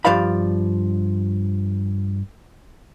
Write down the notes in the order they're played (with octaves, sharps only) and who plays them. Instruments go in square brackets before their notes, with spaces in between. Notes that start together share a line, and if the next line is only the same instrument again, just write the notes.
[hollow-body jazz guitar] G2 F3 D5 F5 B5